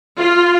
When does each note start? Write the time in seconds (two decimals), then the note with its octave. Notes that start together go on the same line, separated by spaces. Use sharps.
0.18 F4